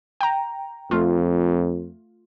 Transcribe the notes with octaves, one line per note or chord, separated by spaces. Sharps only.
G5 A#5
F2 A3 F4